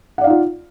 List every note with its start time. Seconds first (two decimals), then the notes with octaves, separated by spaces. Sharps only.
0.18 F#5
0.21 D5
0.24 F5
0.27 D#4
0.30 F4